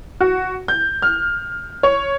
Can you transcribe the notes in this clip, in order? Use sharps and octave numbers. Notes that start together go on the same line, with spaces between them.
F#4
G6
F6
C#5